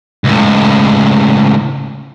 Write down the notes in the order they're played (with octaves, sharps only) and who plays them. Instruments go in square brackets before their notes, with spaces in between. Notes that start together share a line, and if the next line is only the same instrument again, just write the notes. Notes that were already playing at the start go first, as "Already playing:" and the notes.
[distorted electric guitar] C#2 A2